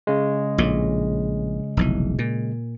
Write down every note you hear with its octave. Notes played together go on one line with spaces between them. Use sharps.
C#3 G#3
A#1 A2
F1 B1 E3
A#2